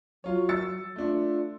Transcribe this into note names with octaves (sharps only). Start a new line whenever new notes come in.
F#3 F4 C#5
E6 A6 C#7
A3 D4 F4